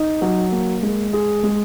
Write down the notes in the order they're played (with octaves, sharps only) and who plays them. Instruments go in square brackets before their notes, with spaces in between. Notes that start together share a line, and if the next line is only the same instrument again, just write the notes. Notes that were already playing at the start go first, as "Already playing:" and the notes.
Already playing: [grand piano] D#4
F#3
A#3
G#3
G#4
G#3